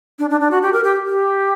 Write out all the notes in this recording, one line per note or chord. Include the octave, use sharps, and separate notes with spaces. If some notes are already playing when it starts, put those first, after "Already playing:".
D4
D4
D4
F#4
G4
A#4
G4
G4